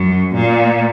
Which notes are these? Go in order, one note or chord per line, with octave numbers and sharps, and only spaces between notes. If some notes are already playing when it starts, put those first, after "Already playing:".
Already playing: F#2
A#2